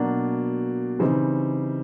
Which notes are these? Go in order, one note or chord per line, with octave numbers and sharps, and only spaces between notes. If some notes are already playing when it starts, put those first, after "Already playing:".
Already playing: B2 F#3 A#3 D4
C#3 E3 G3 C4 D#4